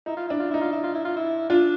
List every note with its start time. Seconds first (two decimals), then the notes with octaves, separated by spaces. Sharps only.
0.06 D#4 E4
0.17 F4
0.28 D4 E4
0.40 F4
0.51 D#4 E4
0.61 F4
0.72 E4
0.83 F4
0.94 E4
1.05 F4
1.16 E4
1.50 D4 F4